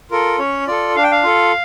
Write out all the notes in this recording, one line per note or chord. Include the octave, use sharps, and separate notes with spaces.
F4 A4 A#4
C#4 C#5
F4 A4 D5
D4 F5
G5
F5
F4 A4